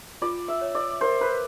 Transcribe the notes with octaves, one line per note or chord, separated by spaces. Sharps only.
F4 D5
E5
C#5
D5
A#4 C5
B4